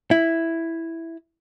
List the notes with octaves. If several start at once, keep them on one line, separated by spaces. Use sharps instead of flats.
E4